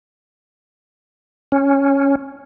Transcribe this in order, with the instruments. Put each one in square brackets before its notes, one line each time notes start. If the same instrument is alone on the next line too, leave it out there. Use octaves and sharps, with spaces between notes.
[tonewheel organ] C#4